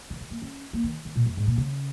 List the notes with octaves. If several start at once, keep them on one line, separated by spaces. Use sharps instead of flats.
D#3
D#3
A#3
C#4
A#3
D#3
D#3
A#2
F2
G#2
A#2
C#3